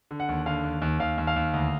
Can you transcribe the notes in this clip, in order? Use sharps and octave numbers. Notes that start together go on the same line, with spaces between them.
D3
F#5
D#2
D3 F5
D#2
D#2
D#2 F5
D#2
F5
D#2
D2